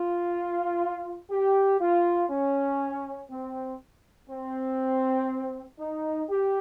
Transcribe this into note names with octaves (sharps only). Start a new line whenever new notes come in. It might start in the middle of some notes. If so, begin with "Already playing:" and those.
Already playing: F4
G4
F4
C#4
C4
C4
D#4
G4